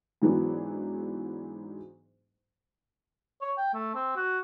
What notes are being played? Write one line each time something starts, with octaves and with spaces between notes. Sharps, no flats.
G#2 E3 F#3 G#3 B3 D4
C#5
G5
A3
C4
F#4